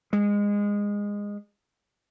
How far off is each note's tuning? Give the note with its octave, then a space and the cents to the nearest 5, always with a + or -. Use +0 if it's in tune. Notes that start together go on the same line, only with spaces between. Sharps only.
G#3 -20